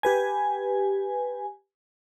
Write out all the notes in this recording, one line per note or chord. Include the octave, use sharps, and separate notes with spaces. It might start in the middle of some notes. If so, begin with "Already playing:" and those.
G4 B4 G#5